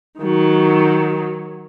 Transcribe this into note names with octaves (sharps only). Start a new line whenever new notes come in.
D#3 F#3